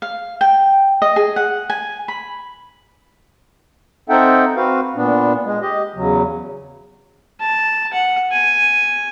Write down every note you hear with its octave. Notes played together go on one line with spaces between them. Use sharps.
F5
G5
D#5
G#4
F#5
G#5
B5
C4 D#4 A4 E5 F#5 G5
C4 F#4 B4 F5
A#2 B3 D4
G#3
G4 D#5
E2 C#3 F#3
A5
F#5
G#5